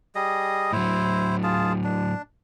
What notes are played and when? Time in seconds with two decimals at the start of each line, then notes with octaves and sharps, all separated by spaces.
0.15 G3 G#4 D#5
0.73 A2 F#3 E4 C5
1.43 F4 G#4 A5
1.84 D4